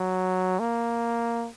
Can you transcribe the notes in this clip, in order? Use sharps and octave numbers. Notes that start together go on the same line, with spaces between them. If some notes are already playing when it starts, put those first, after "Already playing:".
Already playing: F#3
A#3